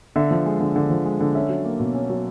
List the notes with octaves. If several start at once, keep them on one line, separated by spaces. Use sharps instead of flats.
D3 E5
F3
G#3
D3
D3
F3
G#3
D3
C#4 E5
F#3
A#3
B2
C#4
F#3